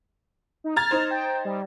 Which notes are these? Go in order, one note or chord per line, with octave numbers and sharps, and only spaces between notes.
D#4
A#5 F6 G#6 A6
D#4 C5
G5
G3